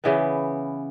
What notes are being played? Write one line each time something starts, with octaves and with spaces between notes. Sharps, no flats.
C#3 E3 B3